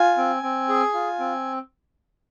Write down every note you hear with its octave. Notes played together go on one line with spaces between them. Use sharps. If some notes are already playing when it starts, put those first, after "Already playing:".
Already playing: F4 G#5
C4
C4
G#4
F4
C4